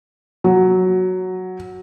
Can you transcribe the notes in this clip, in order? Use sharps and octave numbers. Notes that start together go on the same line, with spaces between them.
F#3